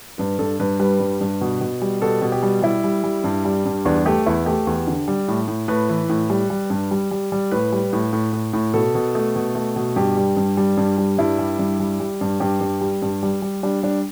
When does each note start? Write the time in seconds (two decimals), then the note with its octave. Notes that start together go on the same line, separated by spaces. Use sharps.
0.18 G2 B4
0.39 G2 A4
0.60 G2 B4
0.80 G3 B4
1.00 G2
1.21 G2
1.41 B2
1.61 B2
1.82 G3
2.02 B2 A4
2.22 B2
2.32 G4
2.43 G3
2.62 G3 E4
2.84 G3
3.04 G3
3.24 G2
3.45 G3
3.65 G2
3.85 E2 D4
4.05 A3 G4
4.26 E2 E4
4.46 A3 G4
4.67 E2
4.87 D3
5.08 G3
5.28 A2
5.48 A2
5.68 A2 B4
5.90 E3
6.09 A2
6.30 G3
6.50 G3
6.70 G2
6.91 G3
7.11 G3
7.32 G3
7.51 A2 B4
7.72 G3
7.93 A2
8.13 A2
8.33 A2
8.53 A2
8.74 B2 A4
8.95 B2
9.15 A3
9.36 B2
9.55 A3
9.76 B2
9.96 G2 G4
10.17 G3
10.37 G2
10.57 G3
10.77 G2
10.98 G3
11.18 G2 E4
11.39 G3
11.59 G2
11.80 G3
12.00 G3
12.21 G2
12.40 G2 G4
12.61 G2
12.81 G3
13.02 G2
13.23 G3
13.42 G3
13.63 G3 D4
13.83 G3 D4